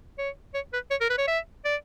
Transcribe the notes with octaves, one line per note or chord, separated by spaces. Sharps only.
C#5
C#5
B4
C#5
A#4
B4
C#5
E5
D5